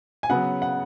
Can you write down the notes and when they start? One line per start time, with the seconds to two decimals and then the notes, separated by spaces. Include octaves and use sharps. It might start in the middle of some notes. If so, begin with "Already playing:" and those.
0.23 G#5
0.30 C#3 F#3 B3 F#5
0.62 F#5